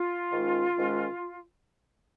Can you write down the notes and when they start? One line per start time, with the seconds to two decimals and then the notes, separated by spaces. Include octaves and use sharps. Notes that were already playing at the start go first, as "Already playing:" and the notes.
Already playing: F4
0.33 G#2 D#3 G#3 C#4
0.74 G#2 D#3 G#3 C#4